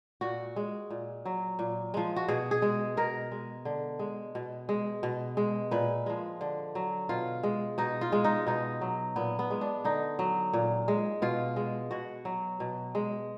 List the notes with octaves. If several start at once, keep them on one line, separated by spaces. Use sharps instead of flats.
A#2 F#4
G#3
A#2
F#3
A#2
F3 G#3
F#4
B2 G#4
G#4
G#3
B2 A#4
G#3
D3
G#3
B2
G#3
B2
G#3
A#2 B4
F3 G#3
D3
F#3
B2 F4
G#3
B2 D#4
F4
G#3
D#4
B2 D#4
F#3
A#2 B3
B3
G#3
D4
D3 D#4
F#3
A#2
G#3
B2 F4
G#3
B2 F#4
F#3
B2
G#3